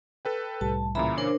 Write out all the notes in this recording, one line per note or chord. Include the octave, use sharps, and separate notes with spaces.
A4 B4 G5
C2 A2 G3 A5
A#2 C#3 E3 E5 A#5 B5
D4 A#4 C5 C#5 D6